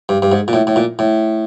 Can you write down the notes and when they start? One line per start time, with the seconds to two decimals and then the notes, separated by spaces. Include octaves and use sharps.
0.09 G2
0.22 G2
0.32 G#2
0.48 A#2
0.53 A2
0.67 A2
0.76 A#2
0.99 A2